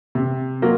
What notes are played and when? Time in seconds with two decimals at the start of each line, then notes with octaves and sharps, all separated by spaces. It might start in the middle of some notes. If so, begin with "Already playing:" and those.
0.15 C3
0.62 F#3 A#3 F4